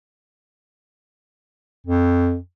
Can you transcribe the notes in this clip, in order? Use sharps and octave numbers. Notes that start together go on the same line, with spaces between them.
F2